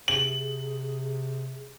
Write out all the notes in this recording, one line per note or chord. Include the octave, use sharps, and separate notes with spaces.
C3 G#4 F#7